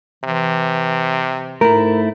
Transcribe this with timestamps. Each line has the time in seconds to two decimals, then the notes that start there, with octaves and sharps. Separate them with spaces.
0.24 C3 E3
1.61 G#2 A3 E4 A#4